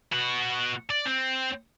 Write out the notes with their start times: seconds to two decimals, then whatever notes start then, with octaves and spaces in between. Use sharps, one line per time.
0.12 B2 F#4
0.90 D5
1.06 C4